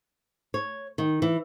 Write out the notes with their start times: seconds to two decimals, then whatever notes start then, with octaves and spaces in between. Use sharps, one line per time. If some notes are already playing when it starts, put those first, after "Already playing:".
0.54 C#5
0.98 D#3
1.22 E3